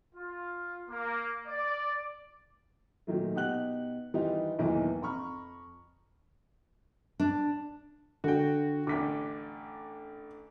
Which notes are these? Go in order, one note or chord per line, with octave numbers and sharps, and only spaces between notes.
F4
A#3
D5
A#2 D#3 F#3 A3
B2 D#4 G4 F#5 F#6 F#7
D#3 E3 G3 D#4 F4 G4
B1 E2 B2 D#3 E3 A#3
F2 A#5 B5 C#6 F6
D4
D3 F#4 G5
A1 D3 D6 B6